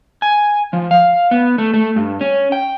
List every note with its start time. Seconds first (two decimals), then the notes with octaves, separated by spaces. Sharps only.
0.22 G#5
0.73 F3
0.91 F5
1.31 B3
1.58 A3
1.74 A3
1.96 G2
2.21 C#4
2.52 G5